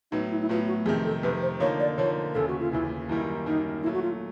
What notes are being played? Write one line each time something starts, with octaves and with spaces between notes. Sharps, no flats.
A2 F#3 B3 D#4
E4
E4
A2 F#3 B3 F4
F#4
F2 C3 D#3 G#4
A4
F2 C3 D#3 B4
C5
D3 F3 A#3 D#4 C#5
D5
D3 F3 A#3 D#4 C#5
D#2 C#3 E3 A4
F#4
F4
D#2 C#3 E3 E4
F#2 D#3 G3 A#3 E4
F#2 D#3 G3 A#3 D#4
A#2 F#3 A3 E4
F#4
F4